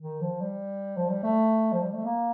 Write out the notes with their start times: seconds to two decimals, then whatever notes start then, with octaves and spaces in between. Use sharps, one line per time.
0.01 D#3
0.21 F3
0.41 G3
0.97 F3
1.10 G3
1.23 A3
1.72 F3
1.83 G3
1.94 A3
2.05 A#3